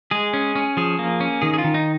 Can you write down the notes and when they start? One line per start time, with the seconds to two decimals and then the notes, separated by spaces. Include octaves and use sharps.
0.11 G#3 G#4
0.34 C#4
0.56 C#4
0.77 F3 G#4
0.99 A#3
1.21 C#4
1.42 D#3 G#4
1.54 G#4
1.58 F4
1.64 D#3
1.74 D#4